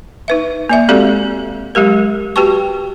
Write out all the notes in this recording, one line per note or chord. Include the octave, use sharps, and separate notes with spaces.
D#4 B4 E5
A#3 D5 E5
G#3 C4 F#4 G4 A4 D5
F#3 G#3 G4 A#4
F#4 G4 B4 G5 A5 C#6